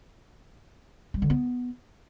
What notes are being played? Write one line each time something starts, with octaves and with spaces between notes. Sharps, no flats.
G3
D3
B3